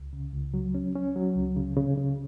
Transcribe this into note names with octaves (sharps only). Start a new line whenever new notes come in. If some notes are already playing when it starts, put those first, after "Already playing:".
Already playing: C#2
C#3
C#2
F#3
C#4
C#4
F#3
C#2
C#3
C#3
C#3